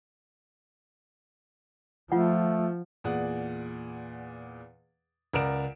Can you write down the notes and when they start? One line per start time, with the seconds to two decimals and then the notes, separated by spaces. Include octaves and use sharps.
2.12 F3 A3 F4 F#5
3.04 E2 A#2 G#4 D5 F#5
5.34 C#2 A#4 D5 F#5 D7 E7